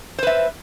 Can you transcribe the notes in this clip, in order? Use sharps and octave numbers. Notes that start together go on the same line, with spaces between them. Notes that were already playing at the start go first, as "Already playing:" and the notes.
B4 C5 E5